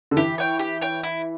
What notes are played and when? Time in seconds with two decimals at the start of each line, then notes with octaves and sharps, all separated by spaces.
0.11 D3
0.17 E3 G4
0.38 C#5 G5
0.59 G4
0.81 C#5 G5
1.03 E4